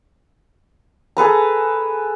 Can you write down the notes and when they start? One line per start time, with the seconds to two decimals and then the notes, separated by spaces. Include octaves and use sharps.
1.17 G#4 A4 B4 A#5